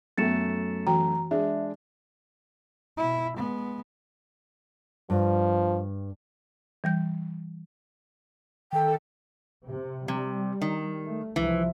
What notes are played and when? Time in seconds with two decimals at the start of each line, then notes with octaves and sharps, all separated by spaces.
0.18 F#2 A3 B3 A4 A6 C#7 E7
0.87 E3 F#4 G5 A#5
1.31 G#3 D4 G#4 E5
2.97 B2 E4
3.36 G#3 B3
5.10 G2 F3
6.84 E3 G3 G6
8.73 D#3 A4 G5
9.68 C3
10.08 C3 G3
10.61 D#3
11.03 A3
11.36 C2 E3 F3